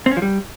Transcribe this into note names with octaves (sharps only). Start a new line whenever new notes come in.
C4
C#4
F3
G3